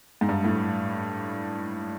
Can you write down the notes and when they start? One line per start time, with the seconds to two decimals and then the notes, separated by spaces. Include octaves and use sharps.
0.21 G#2
0.29 G2
0.44 A2